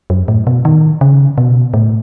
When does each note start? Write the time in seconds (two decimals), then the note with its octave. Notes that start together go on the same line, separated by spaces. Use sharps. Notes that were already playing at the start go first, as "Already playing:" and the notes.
0.10 F#2
0.28 A2
0.47 B2
0.65 D#3
1.01 C#3
1.38 B2
1.74 A2